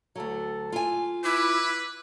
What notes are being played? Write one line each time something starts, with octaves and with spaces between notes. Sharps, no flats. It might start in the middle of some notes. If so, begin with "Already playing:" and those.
D2 F#3 A4
F4 G#5
E4 B4 D6